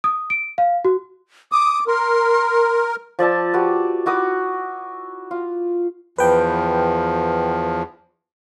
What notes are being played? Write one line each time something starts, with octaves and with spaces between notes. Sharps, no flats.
D#6
D7
F5
F#4
D6 D#6
A#4 C6
F3 D5 E5 A5
F#4 G4 B4
E4 F#4 D6 D#6
F4
E2 F3 B4 G5